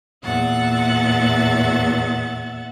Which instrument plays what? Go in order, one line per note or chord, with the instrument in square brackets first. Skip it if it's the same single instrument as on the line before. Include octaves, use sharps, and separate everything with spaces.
[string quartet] E2 A#2 A#3 E5 F#5 A6